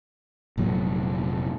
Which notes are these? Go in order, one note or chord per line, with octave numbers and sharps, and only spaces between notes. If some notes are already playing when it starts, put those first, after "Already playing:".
F1 A#2 F#3 A3